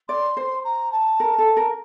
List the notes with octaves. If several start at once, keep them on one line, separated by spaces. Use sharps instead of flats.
D5 C6
C5
A#5
A5
A#4
A4
A#4